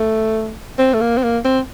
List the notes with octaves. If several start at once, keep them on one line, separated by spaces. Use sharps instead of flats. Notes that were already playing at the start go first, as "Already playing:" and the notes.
Already playing: A3
C4
A3
A#3
C4
A#3
C4